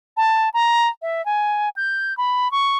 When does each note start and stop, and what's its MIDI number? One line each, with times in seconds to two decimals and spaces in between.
0.17 0.49 81
0.54 0.88 82
1.02 1.24 76
1.26 1.69 80
1.76 2.16 91
2.17 2.51 83
2.51 2.78 85